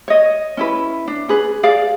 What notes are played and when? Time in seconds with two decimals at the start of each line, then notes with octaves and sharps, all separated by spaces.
0.08 C#5 D#5
0.57 C#4 E4 B4
1.08 D4
1.28 C#4 G#4 B4
1.63 G#4 D5 F5